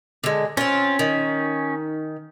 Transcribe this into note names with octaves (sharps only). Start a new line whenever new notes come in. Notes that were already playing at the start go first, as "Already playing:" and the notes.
D3 G#3
C4 C#4 F4
D#3